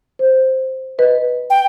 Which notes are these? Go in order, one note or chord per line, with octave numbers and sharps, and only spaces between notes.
C5
B4 D#5
G5